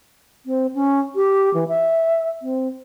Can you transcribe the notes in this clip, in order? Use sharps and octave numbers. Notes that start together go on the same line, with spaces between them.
C4
C#4
G4
E3
E5
C4